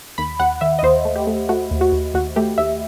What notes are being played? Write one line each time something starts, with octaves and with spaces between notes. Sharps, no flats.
D#2 B5
D#2 F#5
D#3 E5
D#5
D#2 C5
A3
G4
A3
A3 F#4
D#2
F#4
D#2
D#2 F#4
A3 G4
D#2 E5